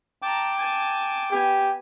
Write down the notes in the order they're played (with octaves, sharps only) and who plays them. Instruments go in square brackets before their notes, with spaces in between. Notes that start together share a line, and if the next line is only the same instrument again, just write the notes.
[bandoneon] G5 D6 [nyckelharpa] A5 A#5
[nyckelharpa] G#5 A5
[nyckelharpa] B3 G#5 [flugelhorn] G4